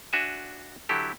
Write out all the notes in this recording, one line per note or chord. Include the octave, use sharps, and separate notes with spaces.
D4 F#4 E5 G#5
D3 F#3 E4 G4 A4